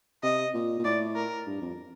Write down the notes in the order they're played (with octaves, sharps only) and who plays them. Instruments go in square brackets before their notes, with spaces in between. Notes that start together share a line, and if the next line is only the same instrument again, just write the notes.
[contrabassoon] C3 [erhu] D#5
[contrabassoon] A#2
A#2
[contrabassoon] A2 [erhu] D5
[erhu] A#4
[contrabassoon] G2
F2